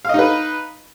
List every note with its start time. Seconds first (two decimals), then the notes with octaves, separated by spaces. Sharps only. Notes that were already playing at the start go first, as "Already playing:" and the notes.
0.05 F5
0.09 D#5
0.14 D#4
0.19 B4